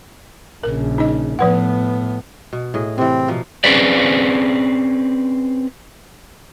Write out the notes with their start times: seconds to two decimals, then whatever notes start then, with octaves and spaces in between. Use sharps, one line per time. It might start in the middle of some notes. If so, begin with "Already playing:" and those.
0.63 A#1 C#3 A#4
0.98 D#4 D#5
1.39 A2 F3 B3 B4 F#5
2.53 B2
2.74 A2 G#4 D#5
2.98 C3 E3 C4
3.28 B2 F3 A#3
3.64 C4 C#4 G#4 B4 C5 D5